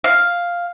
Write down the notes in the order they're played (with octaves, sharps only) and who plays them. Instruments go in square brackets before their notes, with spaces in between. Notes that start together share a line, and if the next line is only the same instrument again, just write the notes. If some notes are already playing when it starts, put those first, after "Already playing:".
[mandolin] F5